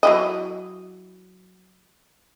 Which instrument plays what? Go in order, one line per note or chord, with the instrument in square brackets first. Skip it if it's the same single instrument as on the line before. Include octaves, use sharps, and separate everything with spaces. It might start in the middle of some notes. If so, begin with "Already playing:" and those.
[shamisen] F#3 E4 D#5